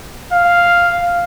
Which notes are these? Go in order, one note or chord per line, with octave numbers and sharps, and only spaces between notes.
F5